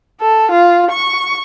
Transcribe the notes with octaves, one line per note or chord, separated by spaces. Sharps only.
A4
F4
C#6